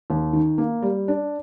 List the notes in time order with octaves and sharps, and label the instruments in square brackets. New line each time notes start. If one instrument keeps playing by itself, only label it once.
[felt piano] D#2
D#3
A#3
G3
D4